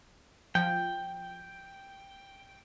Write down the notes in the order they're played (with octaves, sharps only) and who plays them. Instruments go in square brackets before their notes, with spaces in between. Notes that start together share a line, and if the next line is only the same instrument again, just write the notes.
[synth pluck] F3 [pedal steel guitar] G5